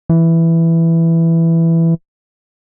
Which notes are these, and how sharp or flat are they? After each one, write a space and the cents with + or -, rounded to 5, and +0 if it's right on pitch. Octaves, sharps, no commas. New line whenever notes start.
E3 +5